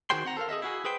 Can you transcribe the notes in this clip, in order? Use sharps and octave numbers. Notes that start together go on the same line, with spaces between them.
D#3 F#4 G#4 C5 G5 C6
C4 F#5 A#5
A4 A#4 F5
G#4 A4 D#5 E5
E4 F#4 G#4
G#4 B4 C5 G5